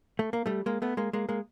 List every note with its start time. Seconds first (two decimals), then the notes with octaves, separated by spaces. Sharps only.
0.19 A3
0.33 A#3
0.46 G3 A3
0.66 G#3 A#3
0.82 A3 B3
0.97 G#3 A#3
1.13 G#3 A#3
1.29 G#3 A#3